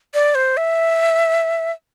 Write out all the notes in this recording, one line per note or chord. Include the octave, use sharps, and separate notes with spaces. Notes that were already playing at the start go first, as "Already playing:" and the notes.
D5
C5
E5